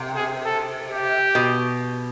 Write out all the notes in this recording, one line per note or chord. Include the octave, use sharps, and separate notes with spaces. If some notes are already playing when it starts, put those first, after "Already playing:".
Already playing: C3
G#4
A4
G4
B2